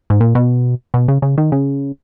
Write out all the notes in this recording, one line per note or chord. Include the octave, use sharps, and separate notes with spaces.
G#2
A#2
B2
B2
C#3
C#3
D#3
C#3